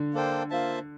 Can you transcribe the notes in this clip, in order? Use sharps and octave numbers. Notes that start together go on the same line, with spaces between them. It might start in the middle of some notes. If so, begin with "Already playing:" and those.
Already playing: D3
A#3 D4 A4 C5 G5
A#3 F4 C5 E5 A5